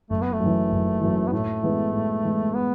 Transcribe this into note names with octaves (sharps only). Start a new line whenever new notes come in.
F#1 A3
B3
A3
F#2
E3
F#1
F#2 E3
B3
A2 A3
E3 G#3 B3 E4
A2
E3 G#3 B3 E4
B3